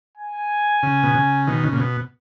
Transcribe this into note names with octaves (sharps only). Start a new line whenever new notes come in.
G#5
C#3
B2
C#3
B2 D#3
C#3
A#2
B2